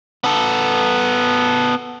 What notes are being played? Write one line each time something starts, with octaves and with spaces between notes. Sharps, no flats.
B3 A4